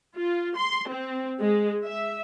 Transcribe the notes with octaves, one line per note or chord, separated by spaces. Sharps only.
F4
C6
C4
G#3
E5